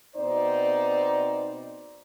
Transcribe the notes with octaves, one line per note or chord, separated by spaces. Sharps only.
B2 C4 D#4 C5 D5